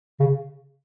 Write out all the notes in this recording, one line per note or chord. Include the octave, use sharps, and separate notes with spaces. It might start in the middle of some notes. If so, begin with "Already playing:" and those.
C#3